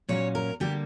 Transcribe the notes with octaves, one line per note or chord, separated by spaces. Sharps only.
A#2 F#3 C#4 C#5
A#4
D3 G3 A#3 G4